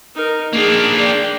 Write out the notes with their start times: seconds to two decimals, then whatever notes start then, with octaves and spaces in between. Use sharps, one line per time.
0.15 D#4 A#4
0.53 A#3 D4 G#4
0.98 D5 G5